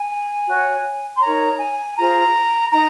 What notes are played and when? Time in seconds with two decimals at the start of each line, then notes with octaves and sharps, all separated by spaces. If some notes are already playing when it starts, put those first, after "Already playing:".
Already playing: G#5
0.45 F#4 C#5
1.16 C6
1.21 D#4 A#4 C#5 A#5
1.59 G#5
1.97 F4 G#4 C5 A#5
2.72 D#4 A#5